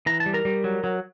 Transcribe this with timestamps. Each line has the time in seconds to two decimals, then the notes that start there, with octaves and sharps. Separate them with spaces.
0.06 E3 A#5
0.20 A5
0.26 G3
0.34 A#4 A#5
0.45 G3
0.64 F#3
0.84 F#3